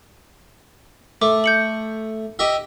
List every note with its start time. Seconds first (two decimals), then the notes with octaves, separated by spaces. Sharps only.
1.22 A3 D6
1.44 G6 C#7 F#7
2.39 G4 D#5 E5